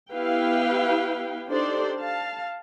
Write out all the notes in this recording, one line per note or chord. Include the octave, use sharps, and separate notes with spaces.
B3 E4 G4 B4 F5 G5
D4 D#4 G4 A4 C5 D5
F5 A5